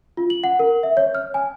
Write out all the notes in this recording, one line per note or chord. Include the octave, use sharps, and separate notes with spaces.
F4
F#7
F#5
A#4
E5
C#5
F6
G#5